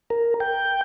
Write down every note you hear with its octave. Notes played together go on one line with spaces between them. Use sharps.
A#4
G5